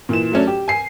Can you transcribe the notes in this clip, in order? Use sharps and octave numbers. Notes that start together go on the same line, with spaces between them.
A#2 E3 E7
F#3 A3 C#4 D4
G4
G#5 C7